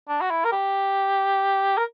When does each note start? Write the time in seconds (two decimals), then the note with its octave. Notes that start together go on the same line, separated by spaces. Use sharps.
0.08 D4
0.21 F#4
0.30 E4
0.45 A#4
0.52 G4
1.78 A#4